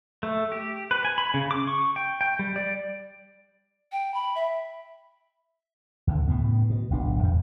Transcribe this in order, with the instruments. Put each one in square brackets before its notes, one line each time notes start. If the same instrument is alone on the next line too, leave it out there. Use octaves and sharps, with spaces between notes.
[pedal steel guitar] A3
G4
B4
G#5
B5
C#3
D6
C#6
G5
G5
G3
D5
[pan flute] G5
B5
E5
[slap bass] D2 D3
A2 C#3 B3
B2
D1 B1 D4
E2